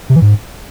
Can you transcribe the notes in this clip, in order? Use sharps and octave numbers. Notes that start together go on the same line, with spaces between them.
C3
E3
G#2